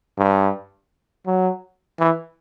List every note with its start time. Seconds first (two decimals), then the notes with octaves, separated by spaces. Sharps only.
0.18 G2
1.26 F#3
1.99 E3